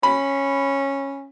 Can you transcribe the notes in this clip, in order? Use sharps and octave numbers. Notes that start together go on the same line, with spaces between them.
C#4 B5